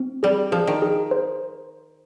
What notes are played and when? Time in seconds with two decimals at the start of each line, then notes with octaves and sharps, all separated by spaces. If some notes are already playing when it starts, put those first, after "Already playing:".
Already playing: C4
0.23 G3 G#4
0.52 F3 G#4
0.67 D#3
0.82 G#4
1.11 C5